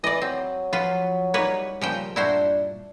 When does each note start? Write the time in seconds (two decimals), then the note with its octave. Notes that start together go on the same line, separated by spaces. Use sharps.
0.04 E3 D5 D#5
0.22 F#3 C4
0.73 F3 F4 B4 F#5
1.34 G3 A#3 D#4 B4 C#5
1.81 C#3 F3 G3 A#3 G5
2.16 G2 A#2 D4 E4 F#4 C5